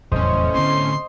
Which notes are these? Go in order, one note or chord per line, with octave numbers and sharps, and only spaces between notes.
F1 E2 A2 F#3 C#4 C5 D#5
D3 B3 C4 C6